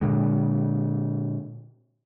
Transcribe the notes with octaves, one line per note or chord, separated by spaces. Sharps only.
A#2 D3 G#3